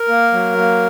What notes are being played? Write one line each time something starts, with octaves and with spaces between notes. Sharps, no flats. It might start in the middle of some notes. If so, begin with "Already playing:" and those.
Already playing: A#4
A#3
F#3
A#3